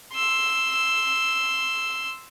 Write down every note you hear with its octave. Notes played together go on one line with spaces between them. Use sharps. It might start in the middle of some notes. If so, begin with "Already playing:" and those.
C6 E6